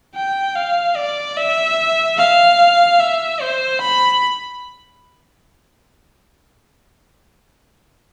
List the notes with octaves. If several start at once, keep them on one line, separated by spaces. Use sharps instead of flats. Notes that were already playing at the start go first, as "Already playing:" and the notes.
G5
F5
D5
E5
F5
E5
C5
B5